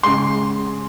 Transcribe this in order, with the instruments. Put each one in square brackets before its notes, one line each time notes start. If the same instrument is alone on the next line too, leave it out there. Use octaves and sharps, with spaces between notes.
[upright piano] C#3 G#3 C6